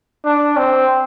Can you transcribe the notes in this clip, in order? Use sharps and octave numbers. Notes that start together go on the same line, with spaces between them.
D4
C4